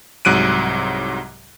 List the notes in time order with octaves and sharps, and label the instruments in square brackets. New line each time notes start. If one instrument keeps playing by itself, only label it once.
[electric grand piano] C2 G#2 F#3 F#6 D7 D#7